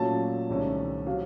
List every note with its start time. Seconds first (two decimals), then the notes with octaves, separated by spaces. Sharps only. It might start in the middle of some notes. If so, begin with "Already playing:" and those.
Already playing: A#2 F#3 A3 C#4 A5
0.50 C2 C3 D#3 A3 C#4
1.07 C3 F#3 F5